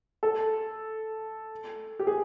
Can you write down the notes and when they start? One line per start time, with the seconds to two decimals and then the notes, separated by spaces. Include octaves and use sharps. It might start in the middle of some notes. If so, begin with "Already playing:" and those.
0.23 A4
1.99 G4
2.07 G#4